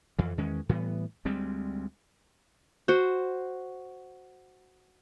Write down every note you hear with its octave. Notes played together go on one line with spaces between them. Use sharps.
F2 E3
E2 D#3 G#3 C#4
A2 E3 G3 B3
D2 G3 G#3 C4
F#4 C5